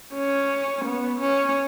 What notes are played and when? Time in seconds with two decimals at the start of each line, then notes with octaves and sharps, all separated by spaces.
0.14 C#4
0.85 B3
1.21 C#4